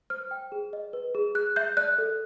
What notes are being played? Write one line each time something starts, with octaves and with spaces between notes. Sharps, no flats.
C5 F6
G5
G#4
D#5
B4
G#4
G#4 F#6
E5 G6
D5 F#6
A4